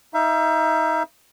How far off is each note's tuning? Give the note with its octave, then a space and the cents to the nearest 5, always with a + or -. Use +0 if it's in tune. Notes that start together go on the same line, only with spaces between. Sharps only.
D#4 +25 E5 +35